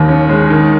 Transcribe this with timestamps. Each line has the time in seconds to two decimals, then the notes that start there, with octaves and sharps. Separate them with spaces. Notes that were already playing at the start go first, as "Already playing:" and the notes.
Already playing: D#2 D#3
0.08 C#4
0.29 G#3
0.50 D#3